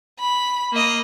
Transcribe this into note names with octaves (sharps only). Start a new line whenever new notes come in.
B5
A#3 D#5